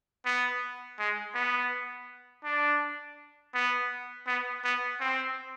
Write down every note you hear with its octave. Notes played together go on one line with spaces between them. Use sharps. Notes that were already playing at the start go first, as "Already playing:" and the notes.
B3
G#3
B3
D4
B3
B3
B3
C4